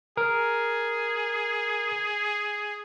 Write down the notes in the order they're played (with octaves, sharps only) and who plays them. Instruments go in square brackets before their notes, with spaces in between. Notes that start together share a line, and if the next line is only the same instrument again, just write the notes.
[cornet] G#4 [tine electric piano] A#4